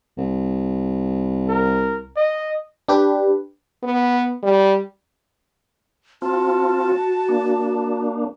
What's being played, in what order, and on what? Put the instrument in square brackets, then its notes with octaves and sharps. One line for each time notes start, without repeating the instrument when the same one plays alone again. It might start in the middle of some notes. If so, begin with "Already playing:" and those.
[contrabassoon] C2
[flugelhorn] A#4
D#5
[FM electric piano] D4 G4 B4
[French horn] B3
G3
[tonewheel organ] C4 F4 [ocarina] F#4 [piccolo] A5
[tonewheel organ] A#3 D4